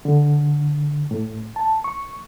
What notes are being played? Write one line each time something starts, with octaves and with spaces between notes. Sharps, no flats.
D3
A2
A5
C#6